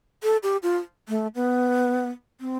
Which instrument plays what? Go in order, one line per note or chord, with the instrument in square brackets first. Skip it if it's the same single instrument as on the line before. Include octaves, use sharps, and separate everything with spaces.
[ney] A4
G4
F4
A3
B3
C4